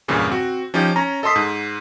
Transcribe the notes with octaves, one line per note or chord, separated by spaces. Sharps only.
E2 G2 A#2 C#3 E3
C4 F#4
F3 C#4 D#4 G4
C#4 A#5
A4 D#5 A5 C6 D#6 B6
G#2